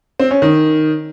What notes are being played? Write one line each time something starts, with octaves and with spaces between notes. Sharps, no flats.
C4
C#4
D#3